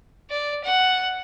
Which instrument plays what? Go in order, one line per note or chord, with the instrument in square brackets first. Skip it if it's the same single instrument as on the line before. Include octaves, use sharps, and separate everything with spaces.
[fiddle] D5
F#5